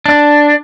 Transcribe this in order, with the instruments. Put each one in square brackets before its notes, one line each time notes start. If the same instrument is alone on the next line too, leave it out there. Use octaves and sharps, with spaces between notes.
[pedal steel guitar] D4